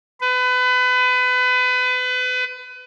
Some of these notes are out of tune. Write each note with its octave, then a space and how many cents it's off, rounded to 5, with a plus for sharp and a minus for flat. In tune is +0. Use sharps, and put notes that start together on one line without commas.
B4 +30